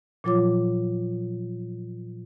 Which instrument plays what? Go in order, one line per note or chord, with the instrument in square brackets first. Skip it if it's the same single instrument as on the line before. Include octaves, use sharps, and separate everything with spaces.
[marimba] A#2 F3 F#3 F4 C#5 D6